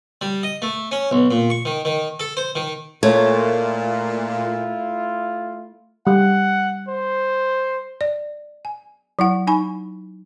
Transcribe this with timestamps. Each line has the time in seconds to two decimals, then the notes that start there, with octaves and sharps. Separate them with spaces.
0.21 G3
0.43 D#5
0.62 A3
0.91 C#4
1.11 B1
1.31 A#2
1.50 C#6
1.65 D#3
1.85 D#3
2.20 A4
2.37 C5
2.55 D#3
3.03 A#2 A3 E4 F4 C#5
6.07 G3 F#5
6.88 C5
8.01 D5
8.65 G#5
9.19 F#3 E4 F#5
9.47 D#4 G#5 B5 C#6